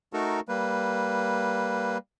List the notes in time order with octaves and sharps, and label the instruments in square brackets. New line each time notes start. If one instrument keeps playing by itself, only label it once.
[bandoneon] A3 D#4 F#4 A4 A#4
G3 A#3 B4